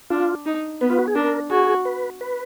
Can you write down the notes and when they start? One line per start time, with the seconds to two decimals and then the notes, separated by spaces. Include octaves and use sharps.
0.10 D4 F4
0.46 D#4
0.81 B3 B4
0.90 F4
0.99 F#4
1.08 G#4
1.15 D4 A#4
1.50 F#4 G#4
1.85 B4
2.21 B4